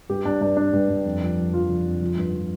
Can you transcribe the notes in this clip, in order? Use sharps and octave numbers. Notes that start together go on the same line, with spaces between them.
G2 G4
G2 D4
G2 D4
G2 D4
G2
G2
F2
F3
F2
F3 F4
F3
F2
F3
G2
F3